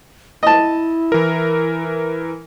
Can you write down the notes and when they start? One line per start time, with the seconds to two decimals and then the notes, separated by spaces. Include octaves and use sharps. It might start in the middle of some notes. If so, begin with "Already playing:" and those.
0.43 E4 D#5 A5
1.12 E3 A#4